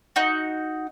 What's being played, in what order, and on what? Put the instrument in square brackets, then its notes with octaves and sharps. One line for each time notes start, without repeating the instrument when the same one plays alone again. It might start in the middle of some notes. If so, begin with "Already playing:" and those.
[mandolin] D#4 F#4